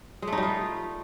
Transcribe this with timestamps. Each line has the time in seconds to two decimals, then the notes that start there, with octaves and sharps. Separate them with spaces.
0.22 G#3
0.27 A3
0.33 D#4
0.38 G3
0.43 F4